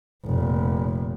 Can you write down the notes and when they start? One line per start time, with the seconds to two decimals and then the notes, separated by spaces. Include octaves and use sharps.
0.24 F1 A#2